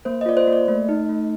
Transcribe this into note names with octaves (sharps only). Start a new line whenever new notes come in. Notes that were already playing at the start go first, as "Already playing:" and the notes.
A#3 C5
D#5
F4 D5
C5
A#3
D5
A3
D#4
A3